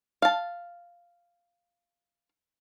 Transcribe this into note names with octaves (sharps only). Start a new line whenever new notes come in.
F5 A5